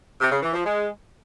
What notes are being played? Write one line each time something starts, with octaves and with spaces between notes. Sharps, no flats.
C3
C#3
E3
F3
G#3